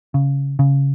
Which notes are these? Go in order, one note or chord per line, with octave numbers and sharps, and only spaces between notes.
C#3
C#3